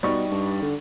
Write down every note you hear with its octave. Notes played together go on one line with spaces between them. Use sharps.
B2 G3 D#4 C#6
G2
D3